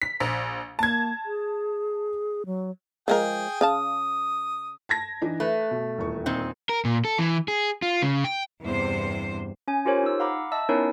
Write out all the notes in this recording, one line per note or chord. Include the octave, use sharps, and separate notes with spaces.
B6
A#1
A#3 A5 G#6
G#4
F#3
F3 G#3 G#4 A#4 G5
C#3 F5 A5 D#6
A5 G#6 A#6
E3 D4 D#4
A3 B4
B2
D#1 E2 C#6
A#2 C4 D#4
A#4
A#2
A4
E3
G#4
F4
C#3
G5
E2 G2 C3 C5
C#4 G#5
F4 G4 A#4 C5 C#5
D#4 E6
F5 F#5 A#5 B5 D6
D#5 E5 A5 E6
B3 C#4 D#4 E4 A#4 C#5